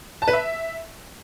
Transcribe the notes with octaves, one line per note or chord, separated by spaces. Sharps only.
A5
B4
E5